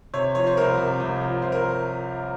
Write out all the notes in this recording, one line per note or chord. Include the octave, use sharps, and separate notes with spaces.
C3 C#5
F3 C#5
C5
C2 A#4
C3
C2
F3
C2 C5
A#4